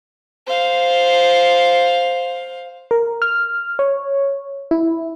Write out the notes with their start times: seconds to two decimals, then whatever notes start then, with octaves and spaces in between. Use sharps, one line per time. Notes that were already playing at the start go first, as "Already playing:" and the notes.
0.46 C5 F5
2.91 A#4
3.22 F6
3.79 C#5
4.71 E4